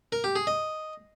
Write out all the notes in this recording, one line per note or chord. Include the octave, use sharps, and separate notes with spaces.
A#4
G4
G#4
D#5